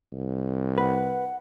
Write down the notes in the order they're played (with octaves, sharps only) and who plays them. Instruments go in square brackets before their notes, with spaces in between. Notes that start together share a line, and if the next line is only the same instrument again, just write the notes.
[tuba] C2
[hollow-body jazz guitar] B4 [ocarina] F#5